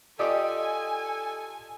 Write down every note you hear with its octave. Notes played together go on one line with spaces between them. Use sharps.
F4 G4 A4 D5 D#5 G5 G#5 D#6